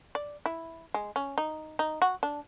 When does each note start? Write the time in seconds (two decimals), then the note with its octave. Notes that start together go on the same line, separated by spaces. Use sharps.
0.15 D5
0.46 E4
0.94 G#3
1.16 C#4
1.38 D#4
1.79 D#4
2.02 F#4
2.23 D4